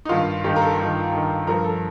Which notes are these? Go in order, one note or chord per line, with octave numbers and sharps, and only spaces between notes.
D#4
G2 D#3 F4
G2 D#3 G4
A#4
A4
G2 D#3
G2 D#3
G2 F3 A#4
A4